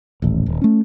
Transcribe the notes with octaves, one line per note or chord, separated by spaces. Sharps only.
D#1 A1
D#1
A3 C#4